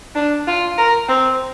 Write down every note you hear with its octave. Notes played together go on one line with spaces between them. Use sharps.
D4
F4
A#4
C4